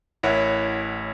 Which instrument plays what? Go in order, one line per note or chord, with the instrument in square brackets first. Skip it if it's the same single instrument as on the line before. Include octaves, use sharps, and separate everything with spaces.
[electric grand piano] A1 E4 A#4 C#5 F#5